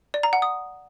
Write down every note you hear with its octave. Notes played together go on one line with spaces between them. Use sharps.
D5
A#5
F#5
D#6